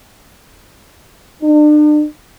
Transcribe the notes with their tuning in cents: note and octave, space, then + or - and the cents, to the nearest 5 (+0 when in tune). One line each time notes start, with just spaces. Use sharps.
D4 +40